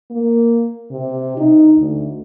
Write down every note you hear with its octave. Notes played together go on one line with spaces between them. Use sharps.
A#3
C3
D#4
D2